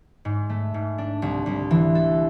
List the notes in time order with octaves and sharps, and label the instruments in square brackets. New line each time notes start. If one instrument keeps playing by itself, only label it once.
[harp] G#2
A3
G#2
D4
C2
C2
E3
A4